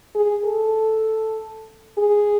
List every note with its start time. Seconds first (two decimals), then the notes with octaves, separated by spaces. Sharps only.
0.15 G#4
0.45 A4
1.98 G#4